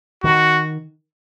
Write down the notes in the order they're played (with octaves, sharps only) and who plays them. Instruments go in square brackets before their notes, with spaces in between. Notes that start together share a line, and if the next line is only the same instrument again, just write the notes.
[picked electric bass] D#3 [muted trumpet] F#4